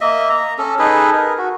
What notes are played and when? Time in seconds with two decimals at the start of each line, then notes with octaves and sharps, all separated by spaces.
0.01 A#3 D#5 E5
0.30 A#5
0.58 C#4 A4
0.79 D#4 G#4 A4 B4
1.13 A#4
1.38 F#4